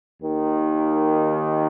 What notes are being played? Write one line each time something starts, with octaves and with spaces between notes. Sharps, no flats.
D#2 D#3